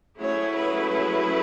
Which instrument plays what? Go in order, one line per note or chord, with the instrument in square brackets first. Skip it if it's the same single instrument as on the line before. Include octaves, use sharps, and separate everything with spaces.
[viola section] F#3 A3 C#4 E4 G#4 [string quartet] C#5
[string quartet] B4